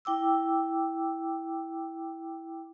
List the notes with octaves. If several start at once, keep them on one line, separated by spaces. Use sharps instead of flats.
E4 G5 D6 E6